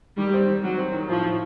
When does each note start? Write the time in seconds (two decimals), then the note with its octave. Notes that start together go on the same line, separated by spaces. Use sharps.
0.17 D#3 G3
0.33 C4
0.48 D#3
0.62 D#3 F#3
0.78 C4
0.93 D#3
1.08 A2 F3
1.24 A2